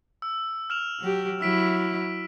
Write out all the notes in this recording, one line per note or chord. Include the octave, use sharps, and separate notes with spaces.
E6
F6 E7 F7
F#3 G4
F#3 E4 E6 B6 D7